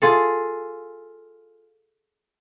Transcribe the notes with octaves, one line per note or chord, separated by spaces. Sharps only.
F4 G#4 A4